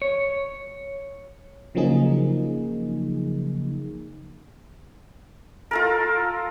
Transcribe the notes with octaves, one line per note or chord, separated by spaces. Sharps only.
C#5
C#3 F3 F#3 A#3 D#4 G#4
F4 A4 A#4